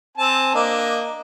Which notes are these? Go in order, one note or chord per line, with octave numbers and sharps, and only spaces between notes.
C4 G#5 A5
A#3 D4 D#5